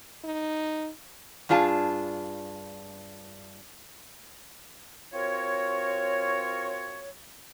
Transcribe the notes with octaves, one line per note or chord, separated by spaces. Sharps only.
D#4
G2 D4 F4 G#4 A5
C4 F4 F#4 A#4 C#5